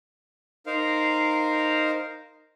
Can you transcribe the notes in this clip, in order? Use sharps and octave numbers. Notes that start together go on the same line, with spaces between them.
D#4 A#4 C5 F5